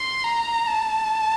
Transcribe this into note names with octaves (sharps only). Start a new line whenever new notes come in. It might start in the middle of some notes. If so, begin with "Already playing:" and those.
Already playing: C6
A#5
A5